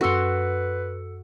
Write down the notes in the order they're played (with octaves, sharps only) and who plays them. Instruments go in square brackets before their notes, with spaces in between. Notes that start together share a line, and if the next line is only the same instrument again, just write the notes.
[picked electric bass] F#2 C#4 [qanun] F#4 C6 [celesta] A4 E6 C#7 [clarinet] B4